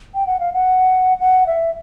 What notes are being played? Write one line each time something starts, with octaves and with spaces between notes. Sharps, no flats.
G5
F#5
F5
F#5
F#5
E5